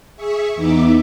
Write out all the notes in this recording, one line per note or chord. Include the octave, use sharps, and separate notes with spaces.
G#4 E5 C#6
E2 B3 D#4 E5 D6